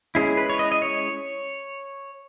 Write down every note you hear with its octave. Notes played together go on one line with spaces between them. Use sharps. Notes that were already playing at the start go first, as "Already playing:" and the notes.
G#3 C#4 E4 G#4
B4
C#5
D#5
D#5
C#5